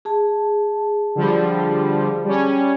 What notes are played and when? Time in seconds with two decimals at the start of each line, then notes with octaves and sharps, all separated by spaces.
0.05 G#4 A5
1.15 D3 F3 G3
2.24 G3 C#4